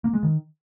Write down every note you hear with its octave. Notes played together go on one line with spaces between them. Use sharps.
A#3
G#3
D#3